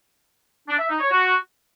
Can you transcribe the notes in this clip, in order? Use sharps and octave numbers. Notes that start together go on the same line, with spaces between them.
D4
E5
D#4
C#5
F#4